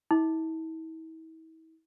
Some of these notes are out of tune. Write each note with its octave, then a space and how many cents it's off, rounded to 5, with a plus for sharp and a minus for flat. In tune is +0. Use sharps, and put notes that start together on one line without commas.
E4 -40